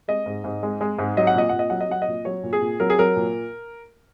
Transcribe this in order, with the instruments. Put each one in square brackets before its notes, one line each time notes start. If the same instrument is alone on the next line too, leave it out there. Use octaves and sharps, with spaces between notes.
[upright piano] G#3 D#5
G#2
G#2
G#3
G#3
G#2
F#3 D#5
F#5
A#2 D#5
A#2 F#5
D#5
F#3 F#5
D#5
F#3 F#5
D#5
A#2
F#3 C#5
A#2
G#4
A#2
F#3 A#4
G#4
F#3 A#4
A#2